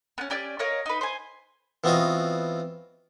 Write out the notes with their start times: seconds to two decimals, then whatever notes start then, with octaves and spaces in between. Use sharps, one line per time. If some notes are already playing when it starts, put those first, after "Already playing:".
0.18 B3 C#4
0.30 C#4 G4 D5 F6
0.59 A#4 C#5 D#5 F5
0.86 D#4 B4
1.01 C5 G#5
1.84 E3 B3 C4 F4 F#4 D#5